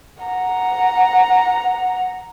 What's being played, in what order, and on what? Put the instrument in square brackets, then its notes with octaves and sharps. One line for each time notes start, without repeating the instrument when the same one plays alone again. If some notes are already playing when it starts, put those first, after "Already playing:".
[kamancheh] F#5 A#5